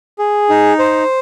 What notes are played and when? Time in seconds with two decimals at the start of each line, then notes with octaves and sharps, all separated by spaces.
0.19 G#4
0.49 D#4
0.79 C5